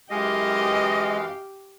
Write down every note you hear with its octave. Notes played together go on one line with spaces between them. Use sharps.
F#2 E3 G#3 G4 D#5 F5